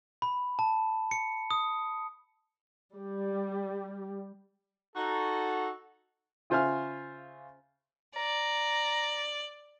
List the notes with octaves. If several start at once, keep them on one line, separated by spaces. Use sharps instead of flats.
B5
A5
C#7
D#6
G3
D#4 F#4 A4
C#3 F4 C5 E5 G#5 F6
D5 A#5